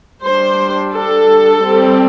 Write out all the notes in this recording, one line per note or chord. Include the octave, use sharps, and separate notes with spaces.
G3 D4 C5
A4
G3 C4